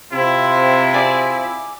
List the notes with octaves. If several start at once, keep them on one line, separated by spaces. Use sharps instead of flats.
C3 C4 E4 F4
G#4 D5